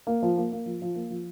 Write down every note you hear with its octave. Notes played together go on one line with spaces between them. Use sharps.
A#3
F3
A#3
A#3
F3
F3
A#3
F3